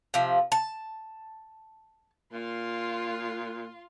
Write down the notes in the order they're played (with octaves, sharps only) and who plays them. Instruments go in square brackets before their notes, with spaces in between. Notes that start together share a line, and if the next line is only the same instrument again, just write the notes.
[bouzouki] C3 F3
A5
[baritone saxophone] A#2 [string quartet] F4 C6